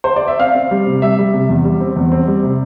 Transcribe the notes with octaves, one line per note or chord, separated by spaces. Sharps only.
C5
D5
E5
C4 F5
C4
G3
C3
G3 E5
G3
C3
E2
G3
C4
E2
C4
G3
C3